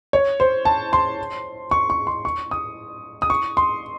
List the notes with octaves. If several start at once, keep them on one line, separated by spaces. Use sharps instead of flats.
C#5
C5
A5
C6
C#6
C#6
C6
C#6
D#6
D#6
C#6
C6